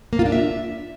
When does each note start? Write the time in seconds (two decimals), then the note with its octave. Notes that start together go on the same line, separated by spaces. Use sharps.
0.13 A#3
0.19 F4
0.26 D4
0.32 E5